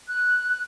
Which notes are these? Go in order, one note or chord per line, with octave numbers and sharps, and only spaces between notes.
F#6